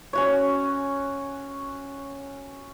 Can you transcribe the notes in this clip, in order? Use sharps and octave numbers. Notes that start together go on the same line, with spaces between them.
C#4 F#4 C#5